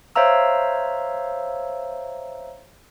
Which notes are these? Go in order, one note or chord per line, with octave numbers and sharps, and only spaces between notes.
C5 C#5 E5 F5 A#5 E6